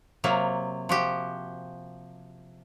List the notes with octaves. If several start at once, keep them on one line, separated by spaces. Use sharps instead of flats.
C3 F#3 A#3
F3 F#4 G4